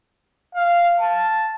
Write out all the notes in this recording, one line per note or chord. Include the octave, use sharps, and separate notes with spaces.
F5
A5